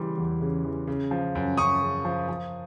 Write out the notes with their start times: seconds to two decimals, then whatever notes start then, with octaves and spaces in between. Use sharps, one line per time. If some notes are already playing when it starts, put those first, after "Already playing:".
Already playing: C#3 E3 G3 C6
0.18 E2
0.41 C#3
0.65 E3
0.87 C#3
1.11 F3
1.35 F#2
1.57 F#2 C#6 D#6
1.82 C#3
2.05 F3
2.29 F3